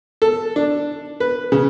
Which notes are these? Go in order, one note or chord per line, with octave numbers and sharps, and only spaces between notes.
A4
D4
B4
C#3